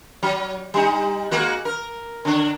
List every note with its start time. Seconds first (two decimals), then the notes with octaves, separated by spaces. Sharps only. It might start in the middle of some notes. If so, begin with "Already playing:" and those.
0.23 F#3
0.74 G3 D#4
1.31 G#3 A#3 F#4
1.65 A#4
2.25 D3 D4